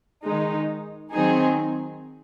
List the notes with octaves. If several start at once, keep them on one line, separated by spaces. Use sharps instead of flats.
D#3 G#3 D#4
D#3 F#3 C4 D#4 G#4